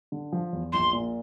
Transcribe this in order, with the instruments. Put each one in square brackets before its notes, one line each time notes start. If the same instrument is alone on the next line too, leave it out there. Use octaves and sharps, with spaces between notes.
[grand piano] D3
F3
E2
[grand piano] A#1 [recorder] C6
[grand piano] A#2